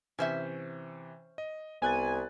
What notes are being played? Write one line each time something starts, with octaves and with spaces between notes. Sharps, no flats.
C3 E3 C#4 C5 E5
D#5
C2 B3 G#5 F#6 A6